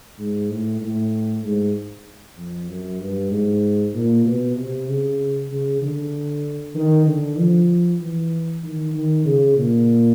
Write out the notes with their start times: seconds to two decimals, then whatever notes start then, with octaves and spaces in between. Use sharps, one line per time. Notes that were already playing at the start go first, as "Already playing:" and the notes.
0.18 G#2
0.49 A2
0.81 A2
1.43 G#2
2.37 F2
2.68 F#2
3.00 G2
3.31 G#2
3.94 A#2
4.25 B2
4.56 C3
4.87 C#3
5.50 C#3
5.82 D3
6.75 D#3
7.06 D3
7.38 F3
8.00 E3
8.63 D#3
8.94 D#3
9.25 C#3
9.57 A#2